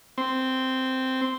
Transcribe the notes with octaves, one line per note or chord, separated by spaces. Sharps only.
C4